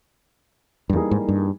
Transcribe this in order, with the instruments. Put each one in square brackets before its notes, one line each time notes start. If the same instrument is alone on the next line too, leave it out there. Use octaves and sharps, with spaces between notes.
[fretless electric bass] G2
[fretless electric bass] E2 [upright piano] E3 G3 A#3 D#4 G#4
[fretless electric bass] G#2
G2